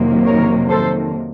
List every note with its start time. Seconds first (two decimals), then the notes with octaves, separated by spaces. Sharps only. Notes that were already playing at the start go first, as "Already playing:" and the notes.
Already playing: F2 C3 D#3 F#3 A#3
0.26 A#4 C#5
0.69 A4 C5